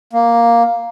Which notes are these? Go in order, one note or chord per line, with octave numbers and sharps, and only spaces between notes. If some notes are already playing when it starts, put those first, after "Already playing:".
A#3